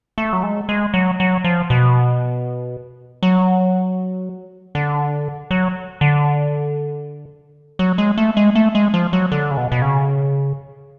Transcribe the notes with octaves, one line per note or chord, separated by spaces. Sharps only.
A3
F#3
G#3
G#3
F#3
F#3
F3
B2
F#3
D3
F#3
D3
F#3
G#3
A3
G#3
A3
G#3
F3
F#3
D3
C#3
B2
B2
C#3